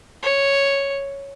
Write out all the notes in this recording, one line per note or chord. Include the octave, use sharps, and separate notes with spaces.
C#5